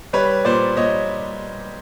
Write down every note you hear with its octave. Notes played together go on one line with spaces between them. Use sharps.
G3 B4 C#5
A#2 C5 D5
A#2 C#5 D#5